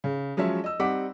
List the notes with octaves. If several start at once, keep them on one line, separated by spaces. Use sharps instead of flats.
C#3
F3 F#3 G#3 C#4 E5
D#5 E6
G3 C4 D#4 F#5 D6 B6